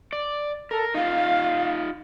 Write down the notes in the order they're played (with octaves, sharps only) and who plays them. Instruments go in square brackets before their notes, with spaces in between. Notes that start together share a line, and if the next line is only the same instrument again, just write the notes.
[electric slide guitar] D5
[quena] A4 [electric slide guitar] A#4
[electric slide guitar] D#4 F4 [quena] F5